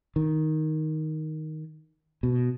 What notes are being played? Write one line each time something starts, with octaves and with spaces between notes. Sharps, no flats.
D#3
B2